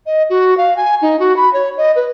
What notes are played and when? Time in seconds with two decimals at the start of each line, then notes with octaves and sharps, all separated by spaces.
0.06 D#5
0.30 F#4
0.57 F5
0.77 G#5
1.02 D#4
1.19 F#4
1.36 B5
1.53 C#5
1.77 D#5
1.96 B4